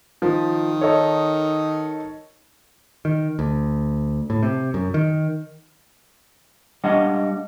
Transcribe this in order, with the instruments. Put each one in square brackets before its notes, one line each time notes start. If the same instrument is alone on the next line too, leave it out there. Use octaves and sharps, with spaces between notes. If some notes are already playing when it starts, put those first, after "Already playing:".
[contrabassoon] D#3 [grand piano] F3
[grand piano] D#4 A4 C#5
[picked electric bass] D#3
D2
A2
C3
F#2
D#3
[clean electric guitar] G3 G#3 D4 D#5 F5 F#5